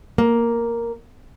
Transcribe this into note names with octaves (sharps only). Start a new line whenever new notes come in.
A#3